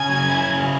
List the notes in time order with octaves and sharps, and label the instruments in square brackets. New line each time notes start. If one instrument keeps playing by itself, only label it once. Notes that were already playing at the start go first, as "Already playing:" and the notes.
Already playing: [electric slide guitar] C#3 [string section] G#5 G#6
[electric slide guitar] F#3
E4
C#3